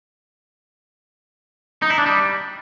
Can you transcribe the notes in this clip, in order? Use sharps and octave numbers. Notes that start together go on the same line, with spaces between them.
D#4
E4
D4
G3